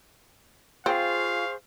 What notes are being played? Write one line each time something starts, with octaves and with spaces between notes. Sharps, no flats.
C4 F4 G#4 C5 F5 C#6